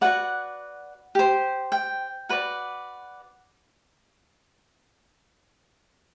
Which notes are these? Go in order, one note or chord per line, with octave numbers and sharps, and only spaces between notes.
F#4 B4 D5 F#5
G4 C5
G5
F#4 B4 D5